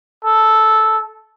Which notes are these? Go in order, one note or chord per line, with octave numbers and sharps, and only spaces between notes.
A4